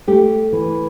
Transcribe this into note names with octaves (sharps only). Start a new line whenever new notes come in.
A3 G4
E3